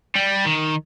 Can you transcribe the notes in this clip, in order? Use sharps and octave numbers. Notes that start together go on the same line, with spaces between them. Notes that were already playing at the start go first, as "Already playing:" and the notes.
G3
D#3